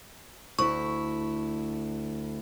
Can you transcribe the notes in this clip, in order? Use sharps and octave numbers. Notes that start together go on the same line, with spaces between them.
D2 E4 C#6